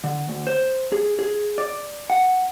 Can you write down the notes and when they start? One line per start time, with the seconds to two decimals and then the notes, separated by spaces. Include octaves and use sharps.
0.04 D3
0.28 D2
0.47 C5
0.92 G#4
1.19 G#4
1.58 D5
2.10 F#5